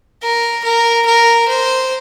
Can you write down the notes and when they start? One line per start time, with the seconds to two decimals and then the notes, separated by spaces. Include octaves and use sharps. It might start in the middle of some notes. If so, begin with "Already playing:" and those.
0.23 A#4
0.64 A#4
1.06 A#4
1.48 C5